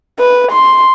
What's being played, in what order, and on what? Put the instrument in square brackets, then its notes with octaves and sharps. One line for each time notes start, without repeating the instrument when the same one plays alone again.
[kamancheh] B4
C6